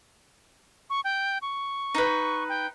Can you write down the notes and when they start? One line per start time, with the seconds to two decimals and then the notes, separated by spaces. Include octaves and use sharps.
0.90 C#6
1.04 G5
1.42 C#6
1.95 D#4 B4
2.49 G5